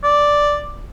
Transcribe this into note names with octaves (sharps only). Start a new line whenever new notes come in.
D5